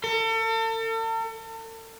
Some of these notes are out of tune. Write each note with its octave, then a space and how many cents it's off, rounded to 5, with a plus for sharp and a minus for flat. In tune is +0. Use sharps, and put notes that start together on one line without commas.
A4 +40